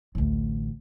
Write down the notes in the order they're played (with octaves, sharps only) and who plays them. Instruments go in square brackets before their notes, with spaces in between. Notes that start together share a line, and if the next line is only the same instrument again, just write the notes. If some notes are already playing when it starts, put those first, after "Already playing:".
[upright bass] A1 D2